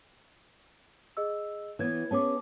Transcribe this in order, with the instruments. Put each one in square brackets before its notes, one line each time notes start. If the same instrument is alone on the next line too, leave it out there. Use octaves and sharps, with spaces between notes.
[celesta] G#4 D#5 E6
[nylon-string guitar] E3 B3 [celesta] C#5 G#6
[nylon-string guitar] B3 C#4 G#4 [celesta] A5 D6